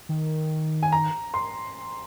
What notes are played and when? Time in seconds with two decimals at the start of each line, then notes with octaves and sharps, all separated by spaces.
0.09 D#3
0.83 G#5
0.92 A#5
1.34 C6